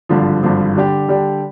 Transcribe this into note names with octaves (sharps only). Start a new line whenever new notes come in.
G#1 G2 D3 F3
G#1 G2 D3 F3
D3 G3 D4 G4
D3 G3 D4 G4